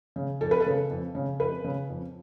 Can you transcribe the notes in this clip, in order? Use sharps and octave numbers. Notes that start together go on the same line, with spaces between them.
C#3
F2 A4
B4
A4
C#3
F2
C#3
F2 B4
C#3
F2